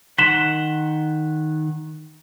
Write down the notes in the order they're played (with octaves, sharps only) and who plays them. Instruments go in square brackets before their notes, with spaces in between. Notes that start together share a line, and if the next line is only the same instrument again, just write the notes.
[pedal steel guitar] D#3 F#5 C6 [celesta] B6 E7